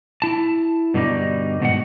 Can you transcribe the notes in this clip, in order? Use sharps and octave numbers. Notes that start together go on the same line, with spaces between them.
E4 A5
G2 B2 D3 G3 D#4
G#2 B2 D#3 F#5